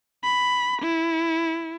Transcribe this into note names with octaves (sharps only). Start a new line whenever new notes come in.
B5
E4